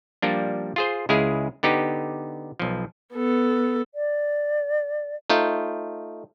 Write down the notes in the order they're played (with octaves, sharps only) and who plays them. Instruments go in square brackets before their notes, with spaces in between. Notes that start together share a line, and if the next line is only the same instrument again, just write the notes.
[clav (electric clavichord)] F3 G3 A#3 D4
F4 G#4 C5
C#2 G#3 E4 G#4 F5
D3 B3 D#4 G4
B1 F3
[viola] B3 A4
[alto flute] D5
[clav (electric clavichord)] A3 D#4 F4 C5